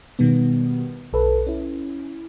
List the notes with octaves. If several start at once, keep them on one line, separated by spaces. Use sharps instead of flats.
B2 D#3 G3 B3
B1 A4 B4
C#4 E4